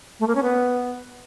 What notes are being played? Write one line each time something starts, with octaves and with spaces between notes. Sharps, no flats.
A3
A#3
C#4
B3